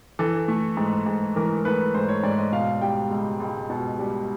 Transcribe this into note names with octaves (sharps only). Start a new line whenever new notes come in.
E3 A4
A3
G#2
G#2
E3 A#4
A3 B4
G#2 C5
C#5
G#2 D5
D#5
B2 F5
G3 G5
C#2
C#2
B2
G3